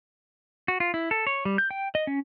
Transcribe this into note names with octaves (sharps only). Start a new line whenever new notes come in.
F#4
F4
E4
A4
C#5
G3
G6
G5
D#5
C#4